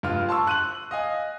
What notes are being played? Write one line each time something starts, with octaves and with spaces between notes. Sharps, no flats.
G2 F4 F6
A5 C6 C#6 E6
F#6 D#7 F#7
D#5 F5 G#5